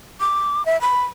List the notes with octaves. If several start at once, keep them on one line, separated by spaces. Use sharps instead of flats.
D6
E5
B5